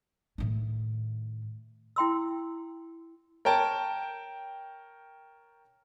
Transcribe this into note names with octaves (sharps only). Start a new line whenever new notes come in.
A2 D#3
E4 G5 C6 E6
A#4 C#5 G5 A5